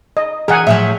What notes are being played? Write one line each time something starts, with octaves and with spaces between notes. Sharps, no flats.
D#5
E3 D#4 G#4 A#4 F#5 G#5
A2 F3 F#3 E5